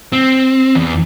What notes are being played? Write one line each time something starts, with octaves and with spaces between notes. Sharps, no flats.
C4
E2